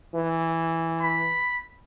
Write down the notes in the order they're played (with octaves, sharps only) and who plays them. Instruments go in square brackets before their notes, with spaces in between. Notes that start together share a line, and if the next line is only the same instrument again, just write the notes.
[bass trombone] E3
[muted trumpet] B5